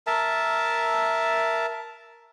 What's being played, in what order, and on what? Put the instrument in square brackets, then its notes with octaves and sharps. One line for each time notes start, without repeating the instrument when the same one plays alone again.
[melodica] A#4 E5 A5